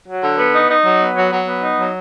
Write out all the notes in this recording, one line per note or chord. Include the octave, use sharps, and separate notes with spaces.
F#3
D3
B3
D#4
D#4
F#3
B3
F#3
F#3
B3
D#4
F#3